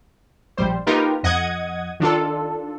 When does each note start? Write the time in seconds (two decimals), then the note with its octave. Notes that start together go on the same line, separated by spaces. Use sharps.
0.57 A#1 G3 C5
0.86 A#3 D#4 F4 G4 A#4 B4
1.23 F2 D#5 F#5 D#6 G#6
2.00 D#3 D4 F4 A4